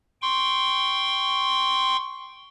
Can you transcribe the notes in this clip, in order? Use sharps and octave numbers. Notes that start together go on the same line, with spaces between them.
G5 C6 C#6